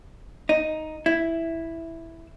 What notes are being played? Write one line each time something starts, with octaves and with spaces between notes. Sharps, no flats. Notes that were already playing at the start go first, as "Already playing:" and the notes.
D#4
E4